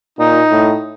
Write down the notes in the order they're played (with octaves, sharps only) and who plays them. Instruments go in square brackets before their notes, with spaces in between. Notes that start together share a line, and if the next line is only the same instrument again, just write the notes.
[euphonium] A#2 [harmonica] D#4
[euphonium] A2